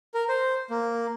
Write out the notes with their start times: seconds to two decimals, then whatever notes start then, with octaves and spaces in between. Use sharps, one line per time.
0.14 A#4
0.29 C5
0.70 A#3